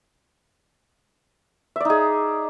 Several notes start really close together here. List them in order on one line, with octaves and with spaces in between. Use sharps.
E5 D5 D#4 G#4